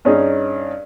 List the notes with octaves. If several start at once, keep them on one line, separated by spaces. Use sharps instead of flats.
G2 C#4 D#4 G#4